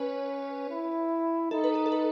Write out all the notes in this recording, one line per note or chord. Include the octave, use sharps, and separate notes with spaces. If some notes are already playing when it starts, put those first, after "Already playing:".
Already playing: C#4 B4 C#5
E4
D#4 A4
B4
A4
A4
B4